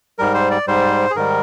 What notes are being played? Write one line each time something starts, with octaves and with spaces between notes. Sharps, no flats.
G#2 G3 A#4
C5
D5
G#2 G3 C5
G#4
G#2 D#3 G3 A#4